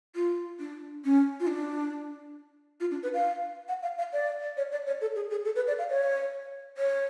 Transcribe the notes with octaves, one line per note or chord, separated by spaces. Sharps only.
F4
D4
C#4
F4
D4
F4
D4
B4
F5
F#5
F5
F5
D5
C#5
D5
C#5
A4
G#4
G#4
A4
B4
D5
F5
C#5
C#5